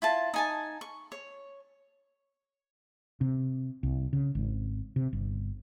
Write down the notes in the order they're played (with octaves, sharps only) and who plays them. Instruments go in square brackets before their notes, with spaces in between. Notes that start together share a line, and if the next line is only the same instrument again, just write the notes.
[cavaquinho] E4 F4 A5
D#4 G#5 A5
C#6
C#5
[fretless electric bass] C3
C2
C#3
G#1
C3
G1